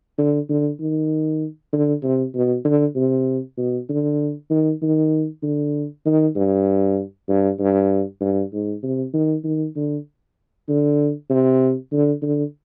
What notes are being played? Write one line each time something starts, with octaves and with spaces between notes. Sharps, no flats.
D3
D3
D#3
D3
C3
B2
D3
C3
B2
D3
D#3
D#3
D3
D#3
G2
G2
G2
G2
G#2
C3
D#3
D#3
D3
D3
C3
D3
D3